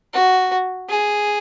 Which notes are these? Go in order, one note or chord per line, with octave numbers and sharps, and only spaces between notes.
F#4
G#4